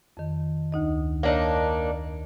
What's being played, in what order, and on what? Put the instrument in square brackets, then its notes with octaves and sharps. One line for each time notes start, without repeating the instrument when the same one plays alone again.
[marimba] F2 D#3
D2 D#4 D#5
[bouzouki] A#3 D4 D#4 [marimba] C#5